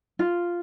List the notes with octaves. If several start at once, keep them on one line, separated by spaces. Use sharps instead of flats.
F4